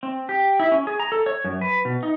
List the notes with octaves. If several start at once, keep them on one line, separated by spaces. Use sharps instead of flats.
C4
G4
E4
C#4
G#4
A#5
A4
C#5
F#2
B4
B2
D#4